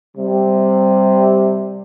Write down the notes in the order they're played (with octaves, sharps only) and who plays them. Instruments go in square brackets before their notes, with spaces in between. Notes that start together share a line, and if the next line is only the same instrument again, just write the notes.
[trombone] C3 [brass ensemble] G3